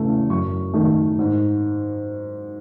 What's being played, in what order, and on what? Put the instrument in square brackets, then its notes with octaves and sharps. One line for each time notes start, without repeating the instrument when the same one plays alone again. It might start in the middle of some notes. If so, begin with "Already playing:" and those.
Already playing: [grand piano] E2 C#3 E3 A3
F#2 C#6
D#3 A3
G#2